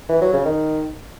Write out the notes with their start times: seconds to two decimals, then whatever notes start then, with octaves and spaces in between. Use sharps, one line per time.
0.09 E3
0.21 F#3
0.33 C#3
0.45 D#3